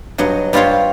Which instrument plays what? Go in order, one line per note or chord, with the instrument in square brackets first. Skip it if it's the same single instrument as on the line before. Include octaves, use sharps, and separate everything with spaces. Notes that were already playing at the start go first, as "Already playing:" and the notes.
[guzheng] G2 F#3 D#5 F#5
G2 G3 F4 C5 C#5 F5